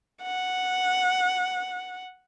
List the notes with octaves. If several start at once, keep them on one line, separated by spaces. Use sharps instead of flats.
F#5